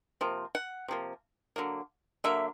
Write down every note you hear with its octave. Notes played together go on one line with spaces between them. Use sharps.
C3 F3 A#3
F#5
C3 F3 A#3
D3 F#3 A#3
D3 F#3 A#3 E5